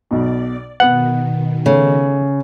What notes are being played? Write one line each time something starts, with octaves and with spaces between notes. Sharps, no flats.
B1 B2 D5
B2 D#3 B3 B4 F#5
C#3 A3